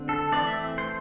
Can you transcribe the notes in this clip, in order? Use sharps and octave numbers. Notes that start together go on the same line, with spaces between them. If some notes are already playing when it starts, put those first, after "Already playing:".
Already playing: D3 C4
A4
E3 A3 C4 D5
E5
C5